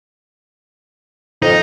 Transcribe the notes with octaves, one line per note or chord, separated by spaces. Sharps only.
F2 D#4